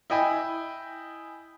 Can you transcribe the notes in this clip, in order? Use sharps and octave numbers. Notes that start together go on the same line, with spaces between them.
E4 D#5 G5 G#5 B5